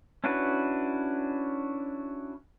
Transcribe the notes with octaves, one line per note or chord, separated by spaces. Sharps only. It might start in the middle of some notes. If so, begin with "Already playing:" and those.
C#4 D4 E4 F#4 B4